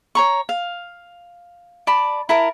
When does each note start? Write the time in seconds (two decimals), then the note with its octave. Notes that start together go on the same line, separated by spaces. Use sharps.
0.15 C#5 A#5 C#6
0.49 F5
1.87 D5 A5 B5
2.29 E4 A#4 A5